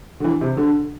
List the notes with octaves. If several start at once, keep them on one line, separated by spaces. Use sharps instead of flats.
D3
E3
C3
D3